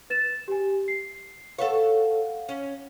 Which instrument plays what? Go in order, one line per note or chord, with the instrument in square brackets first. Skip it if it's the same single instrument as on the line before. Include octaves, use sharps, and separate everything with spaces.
[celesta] B4 A6 E7
G4 G#5
C7
[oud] A4 B4 C#5 [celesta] F5 F#5
[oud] C#4